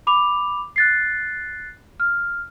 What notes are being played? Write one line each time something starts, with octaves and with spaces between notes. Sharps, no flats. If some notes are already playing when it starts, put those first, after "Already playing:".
B5 D6 F7
F#6 A6 C7
F6